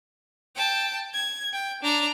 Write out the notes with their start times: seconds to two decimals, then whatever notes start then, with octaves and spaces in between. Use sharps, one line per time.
0.55 G5 A5
1.13 G#6
1.53 G5
1.83 D4 A#5